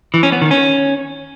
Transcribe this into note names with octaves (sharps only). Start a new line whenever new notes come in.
E3
C#4
B3
D#3
C#4